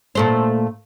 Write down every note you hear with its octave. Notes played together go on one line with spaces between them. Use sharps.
A#2 A3 C5